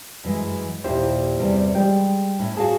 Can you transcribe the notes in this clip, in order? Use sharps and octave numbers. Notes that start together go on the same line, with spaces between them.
F#2 E3 G#3
D#2 A#2 E4 G4 C5
E2 C3 G3
G3 G#3 G5
A2 C#4 E4
F#4 G#4 F5 A5